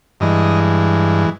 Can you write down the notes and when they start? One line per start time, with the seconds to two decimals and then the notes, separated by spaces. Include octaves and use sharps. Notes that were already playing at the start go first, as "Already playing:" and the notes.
0.20 G2 E3 G#3 D#5